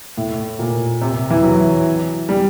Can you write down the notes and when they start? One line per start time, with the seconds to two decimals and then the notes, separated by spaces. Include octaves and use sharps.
0.17 A2
0.59 A#2
1.01 C3
1.30 E3
1.44 F#3
2.29 G3